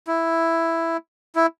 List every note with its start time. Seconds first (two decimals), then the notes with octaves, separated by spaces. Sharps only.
0.07 E4
1.35 E4